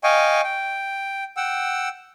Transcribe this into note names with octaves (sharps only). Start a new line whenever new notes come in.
D#5 F5 G5 G#5 C#6
G5
F#5 G5 E6